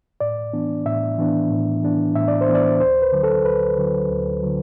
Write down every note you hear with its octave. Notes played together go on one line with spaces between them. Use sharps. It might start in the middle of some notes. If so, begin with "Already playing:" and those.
A2 D5
E3 B3 D4
A2 E5
E3 B3 D4
A2
E3 B3 D4
A2 E5
D5
C5
E3 B3 D4
D5
D2 C5
B4
D3 F#3
A4
D2 B4
D3 F#3
D2
D3 F#3